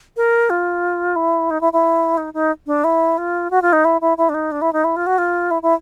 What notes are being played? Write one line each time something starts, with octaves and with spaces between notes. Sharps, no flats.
A#4
F4
E4
D#4
E4
E4
D#4
D#4
D4
E4
F4
F#4
F4
D#4
E4
E4
E4
D4
D#4
D4
E4
D#4
E4
F4
F#4
F4
E4
E4